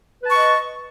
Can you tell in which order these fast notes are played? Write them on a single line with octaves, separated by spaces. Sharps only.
B4 A5 C#6 D#5